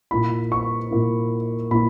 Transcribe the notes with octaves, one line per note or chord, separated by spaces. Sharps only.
A#2 A#3 E4 B5
C#6
A#2 A#3 E4
A#2 A#3 E4 B5